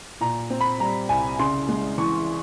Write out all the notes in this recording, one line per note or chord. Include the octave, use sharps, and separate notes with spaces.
A#2 A#5
C4
B5
G3 A#5
C2 G#5
C#3 C6
G#3
E3 C#6